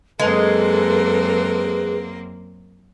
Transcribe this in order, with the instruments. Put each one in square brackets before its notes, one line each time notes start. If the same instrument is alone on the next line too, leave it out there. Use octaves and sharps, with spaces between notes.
[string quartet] F#2 A#3 C4 [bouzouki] G#3 [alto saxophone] A4 [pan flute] B4